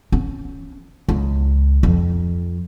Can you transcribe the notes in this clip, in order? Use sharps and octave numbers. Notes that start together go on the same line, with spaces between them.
C#4
C#2
F2